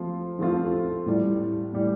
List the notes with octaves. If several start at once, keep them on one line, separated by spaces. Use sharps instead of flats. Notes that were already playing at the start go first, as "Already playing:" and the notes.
Already playing: F3 A3 C4 F4
F3 A3 C4 F4
A2 E3 G3
A2 E3 G3